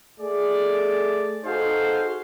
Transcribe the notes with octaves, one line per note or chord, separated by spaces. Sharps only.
A3 G#4 D5
D#4 F#4 G#4 A4 C5 F5